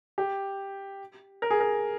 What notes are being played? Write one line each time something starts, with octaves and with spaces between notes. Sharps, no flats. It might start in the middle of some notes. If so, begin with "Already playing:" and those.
G4
A#4
G#4
A#4